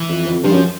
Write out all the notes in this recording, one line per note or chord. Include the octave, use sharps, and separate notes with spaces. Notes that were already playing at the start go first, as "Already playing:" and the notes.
Already playing: E3
F2
F2
G2 F3
F#2